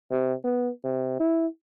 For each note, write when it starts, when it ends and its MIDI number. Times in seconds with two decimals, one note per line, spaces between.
0.11 0.33 48
0.44 0.70 59
0.84 1.17 48
1.20 1.47 64